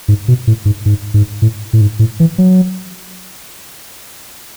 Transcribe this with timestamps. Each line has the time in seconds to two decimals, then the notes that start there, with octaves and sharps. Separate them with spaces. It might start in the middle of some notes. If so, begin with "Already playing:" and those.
0.08 G#2
0.28 B2
0.47 A2
0.65 G#2
0.86 G#2
1.14 G#2
1.42 A2
1.73 A2
1.81 G#2
1.99 A2
2.20 E3
2.38 F#3